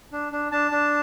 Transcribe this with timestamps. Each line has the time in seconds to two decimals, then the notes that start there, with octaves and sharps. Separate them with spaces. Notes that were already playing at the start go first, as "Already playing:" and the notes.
0.12 D4
0.32 D4
0.52 D4 A5
0.71 D4